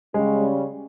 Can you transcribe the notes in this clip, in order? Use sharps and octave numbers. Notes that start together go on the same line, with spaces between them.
C#3 G3 G#3 C#4